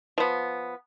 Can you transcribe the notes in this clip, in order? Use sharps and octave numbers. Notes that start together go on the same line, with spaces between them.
F3 B3